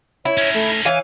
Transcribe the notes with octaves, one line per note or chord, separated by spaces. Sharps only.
E4 C#5
C#4 D#4
A3
E3 C#5 F5 G#5